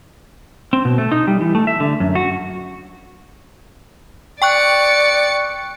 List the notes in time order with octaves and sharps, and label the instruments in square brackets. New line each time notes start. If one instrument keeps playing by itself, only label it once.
[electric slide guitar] C4
B2
A3
D#4
G3
E3
A3
E5
D3
F#2
F#4
[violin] D5 C#7 [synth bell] G5 C#6 F#6